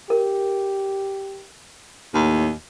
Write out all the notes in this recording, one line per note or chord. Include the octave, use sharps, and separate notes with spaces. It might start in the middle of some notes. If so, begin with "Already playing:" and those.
G4 A#4
D#2 A2